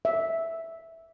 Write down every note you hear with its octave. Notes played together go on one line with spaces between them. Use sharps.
E5